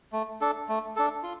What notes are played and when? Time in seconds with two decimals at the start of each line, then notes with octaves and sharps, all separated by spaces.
0.13 A3
0.41 D4 A4
0.69 A3
0.96 D4 A4
1.23 F4